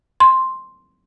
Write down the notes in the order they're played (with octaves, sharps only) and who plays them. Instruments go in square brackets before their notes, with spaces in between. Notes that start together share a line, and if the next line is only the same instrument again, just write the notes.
[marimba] C6